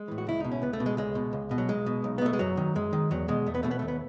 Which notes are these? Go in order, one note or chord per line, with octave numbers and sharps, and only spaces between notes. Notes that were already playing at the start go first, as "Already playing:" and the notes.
Already playing: G#3
A2 E3
F#4
C#2 E4
B2 D#4
C#4
C#2 B3
A3
B2
G#3
C#2 G#3
B2
C#2
B2
F#3
B1 G#3
B2
B1
B3
B2 A3
G#3
F#2 F#3
D#3
F#2 G#3
D#3
E2 F#3
B2 G#3
E2 A3
B3
B2 A3
B3
A3
D#2
B3